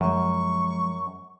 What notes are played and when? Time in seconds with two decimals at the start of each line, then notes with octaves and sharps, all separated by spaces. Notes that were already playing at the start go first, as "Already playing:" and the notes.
0.01 F#2 F3 F#3 G#3 C#6